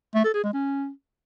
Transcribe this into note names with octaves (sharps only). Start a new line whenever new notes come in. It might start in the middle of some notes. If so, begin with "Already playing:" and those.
A3
A4
G#4
G#3
C#4